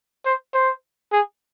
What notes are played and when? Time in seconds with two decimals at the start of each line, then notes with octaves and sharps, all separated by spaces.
0.26 C5
0.54 C5
1.12 G#4